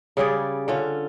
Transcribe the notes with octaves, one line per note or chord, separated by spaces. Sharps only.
C#3 G3 G#4 D5
D3 C#4 F4